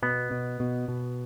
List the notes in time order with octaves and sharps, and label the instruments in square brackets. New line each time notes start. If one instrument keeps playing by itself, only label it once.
[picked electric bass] B2 [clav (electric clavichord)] B3
[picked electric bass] B2
B2
B2